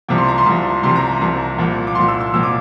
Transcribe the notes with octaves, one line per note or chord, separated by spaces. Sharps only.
C2 C3 F3 D6
C6
A#5
C6
C2 C3 F3
C2 C3 F3 C6
A#5
C2 C3 F3
C2 A#2 F3
D6
C2 A#2 F3 C6
E6
E6
C2 A#2 F3 E6
D6